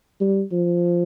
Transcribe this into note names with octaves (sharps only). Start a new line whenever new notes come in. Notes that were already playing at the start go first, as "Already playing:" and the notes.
G3
F3